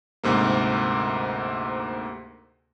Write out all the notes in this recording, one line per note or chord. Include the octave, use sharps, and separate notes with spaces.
D2 G#2 C3 A#3